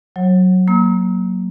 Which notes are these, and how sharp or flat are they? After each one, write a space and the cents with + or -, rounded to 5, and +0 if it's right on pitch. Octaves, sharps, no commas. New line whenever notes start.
F#3 +0 C#5 -45
A#3 +0 E6 -45